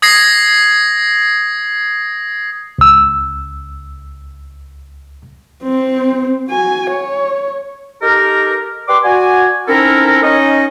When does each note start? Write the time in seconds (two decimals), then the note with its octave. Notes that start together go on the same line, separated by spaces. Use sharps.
0.02 D#6 G#6 A#6 C7
2.79 C#2 E6
5.63 C4 C5
6.49 F#4 G#5
6.90 C#5
8.02 D#4 G4 A4 A#4
8.88 G4 B4 D5 C6 D6
9.04 F#4 D5 G#5
9.68 C4 C#4 D#4 E4 A4 A#4
10.24 C#4 D#4 D#5